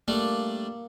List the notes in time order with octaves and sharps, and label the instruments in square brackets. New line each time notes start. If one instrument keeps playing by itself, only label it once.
[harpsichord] G3 A3 D4 [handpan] A#3